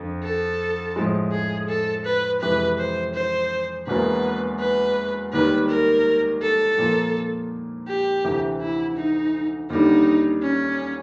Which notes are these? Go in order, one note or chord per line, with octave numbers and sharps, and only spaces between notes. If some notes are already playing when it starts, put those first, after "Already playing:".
Already playing: F2 D3 F3
A4
A2 F3 G#3
G#4
A4
B4
F2 C3 E3 G#3 B4
C5
C5
E1 E2 B2 F#3 A#3 B4
B4
D#2 D#3 G3 B4
A#4
A4
A#2 F3 A#3
G4
D2 C3 E3
E4
D#4
D#2 D3 G3 D#4
C#4